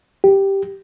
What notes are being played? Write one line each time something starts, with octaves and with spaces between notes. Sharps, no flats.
G4